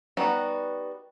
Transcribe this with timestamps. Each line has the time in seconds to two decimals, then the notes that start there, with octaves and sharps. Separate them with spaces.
0.17 G3 B3 D#4 F#4